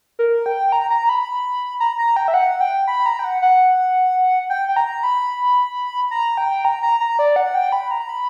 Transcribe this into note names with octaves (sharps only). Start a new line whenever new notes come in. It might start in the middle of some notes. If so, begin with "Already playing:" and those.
A#4
G5
A#5
A#5
B5
A#5
A#5
G5
E5
F#5
G5
B5
A#5
G5
F#5
F#5
G5
G5
A#5
B5
A#5
G5
A#5
A#5
A#5
D5
F#5
G5
B5
A#5
B5